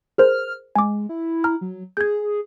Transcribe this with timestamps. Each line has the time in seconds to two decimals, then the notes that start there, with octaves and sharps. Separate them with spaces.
0.18 G#4 A#4 C5 F6
0.76 G#3 G#5 D6
1.09 E4
1.44 A#5 F6
1.61 F#3
1.97 G#4 G6 G#6